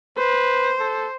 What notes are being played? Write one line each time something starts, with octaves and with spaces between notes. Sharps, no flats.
B4 C5
A4